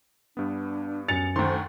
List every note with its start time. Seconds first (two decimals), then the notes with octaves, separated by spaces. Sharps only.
0.37 G2 B3 D4
1.08 F#2 G#5 A6 C#7 F7
1.36 D2 D#3 C5 G5 A#5 C6